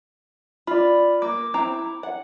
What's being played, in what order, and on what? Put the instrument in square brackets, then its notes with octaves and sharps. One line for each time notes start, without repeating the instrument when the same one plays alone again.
[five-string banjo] F4 [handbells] D5 B5
[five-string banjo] A#3 [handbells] D6
[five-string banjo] C4 E4 A#5
F#5